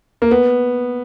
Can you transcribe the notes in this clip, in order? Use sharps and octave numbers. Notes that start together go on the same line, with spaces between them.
A#3
B3